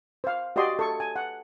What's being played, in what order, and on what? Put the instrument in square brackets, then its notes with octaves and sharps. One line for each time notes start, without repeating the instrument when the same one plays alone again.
[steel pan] C5 F5
F#4 G4 D5 D#5 C6
A4 C#6
G#5
F#5